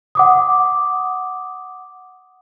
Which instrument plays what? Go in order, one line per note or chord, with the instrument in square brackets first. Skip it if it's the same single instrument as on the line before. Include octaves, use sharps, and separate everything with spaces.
[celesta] F#5 D6 D#6